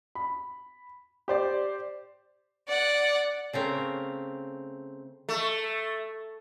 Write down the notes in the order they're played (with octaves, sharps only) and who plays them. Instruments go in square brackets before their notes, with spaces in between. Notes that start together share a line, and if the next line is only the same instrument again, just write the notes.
[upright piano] B5
G4 C5 D5
[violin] D5 F#5
[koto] C#3 A3 C4 A#4
[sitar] A3